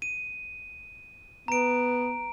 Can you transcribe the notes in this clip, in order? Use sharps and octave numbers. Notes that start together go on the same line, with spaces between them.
D#7
B3 A#5 D7